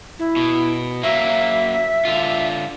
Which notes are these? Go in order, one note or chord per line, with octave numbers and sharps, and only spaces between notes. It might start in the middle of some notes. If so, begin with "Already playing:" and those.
E4
B2
F#3 A#3 E5
D3 F4